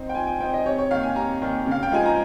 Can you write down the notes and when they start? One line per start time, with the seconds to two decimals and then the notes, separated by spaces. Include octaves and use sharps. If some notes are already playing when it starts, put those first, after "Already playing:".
Already playing: C4 D#4 C6
0.09 G5
0.15 F3 G#5
0.27 G5
0.40 C4 G5
0.44 D#4
0.53 D#5
0.65 C3 C#5
0.78 C#5
0.91 D#3 A#3 F5
1.03 G#5
1.16 C3 A#5
1.41 D#3 A#3
1.66 C#3
1.71 F5
1.83 G5
1.91 F3 G#3 D#4 G#5
2.06 A#5